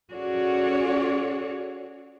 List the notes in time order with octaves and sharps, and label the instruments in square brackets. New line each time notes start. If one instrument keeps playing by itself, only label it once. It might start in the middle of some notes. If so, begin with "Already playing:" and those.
[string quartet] C#4 F#4 G#4 A4 C#5 D5